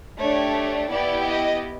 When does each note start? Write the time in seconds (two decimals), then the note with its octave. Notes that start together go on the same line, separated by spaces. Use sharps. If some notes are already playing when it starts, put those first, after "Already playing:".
0.20 A3 D4 G4 C#5
0.91 B3 E4 G4 D5
1.26 D#5